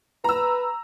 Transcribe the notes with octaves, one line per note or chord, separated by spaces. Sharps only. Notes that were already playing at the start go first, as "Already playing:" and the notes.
B4 A#5 E6